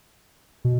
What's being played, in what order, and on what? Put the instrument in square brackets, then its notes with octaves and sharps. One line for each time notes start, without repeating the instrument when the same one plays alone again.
[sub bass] B2